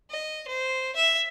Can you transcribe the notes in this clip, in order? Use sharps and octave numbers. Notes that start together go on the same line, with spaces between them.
D#5
C5
E5